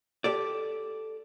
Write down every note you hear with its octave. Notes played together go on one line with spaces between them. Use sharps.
G4 A4 D5